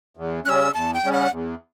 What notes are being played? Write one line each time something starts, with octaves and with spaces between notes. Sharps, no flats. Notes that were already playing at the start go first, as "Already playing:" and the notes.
E2
C#3 G3 C#4 E6 F#6
E2 A5
G5
C#3 G3 C#4
F#5
E2